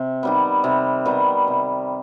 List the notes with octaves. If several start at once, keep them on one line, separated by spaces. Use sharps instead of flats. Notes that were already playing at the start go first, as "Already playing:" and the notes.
Already playing: C3
D#3 G3 B3
C3
D#3 G3 B3
C3